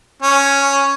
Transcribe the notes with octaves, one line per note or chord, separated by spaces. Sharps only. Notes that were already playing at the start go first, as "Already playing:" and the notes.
C#4